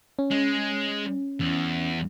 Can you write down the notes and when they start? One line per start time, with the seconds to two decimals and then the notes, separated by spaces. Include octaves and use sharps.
0.19 C#4
0.31 G#3
1.40 E2